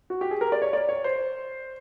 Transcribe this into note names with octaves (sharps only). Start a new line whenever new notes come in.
F#4
G4
G#4
A#4
D5
C#5
D5
C#5
C5